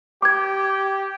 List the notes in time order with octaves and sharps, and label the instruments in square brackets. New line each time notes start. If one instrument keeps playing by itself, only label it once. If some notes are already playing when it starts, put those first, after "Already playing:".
[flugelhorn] G4 [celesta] D6 G#6